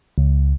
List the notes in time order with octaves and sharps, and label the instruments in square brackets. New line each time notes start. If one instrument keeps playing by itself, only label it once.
[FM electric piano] C#2